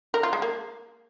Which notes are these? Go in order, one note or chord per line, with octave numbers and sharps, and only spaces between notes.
A#4
F4
G#3
A#3